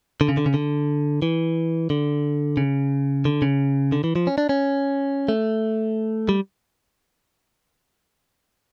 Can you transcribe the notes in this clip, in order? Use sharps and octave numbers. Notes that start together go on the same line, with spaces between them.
D3
C#3
D3
C#3
D3
E3
D3
C#3
D3
C#3
D3
E3
F3
C#4
D4
C#4
A3
G3